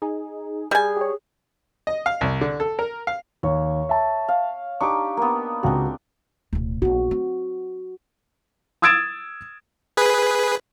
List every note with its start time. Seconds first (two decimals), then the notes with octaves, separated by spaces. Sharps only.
0.02 D#4 G#4
0.71 G3 G#4 G#5
0.97 G4 C#5
1.87 D#5
2.06 F5
2.21 C2
2.41 D3
2.60 A4
2.79 A#4
3.07 F5
3.43 D#2 C#5
3.89 E5 A5
4.28 F5
4.81 D4 D#4 G4 C#6 D6
5.17 A#3 B3
5.63 C#2 C4 D4 F#4
6.53 D1 B1
6.82 A#1 B3 F#4
7.11 C4
8.82 D#6 E6 G#6 A6 D7 E7
9.97 G#4 B4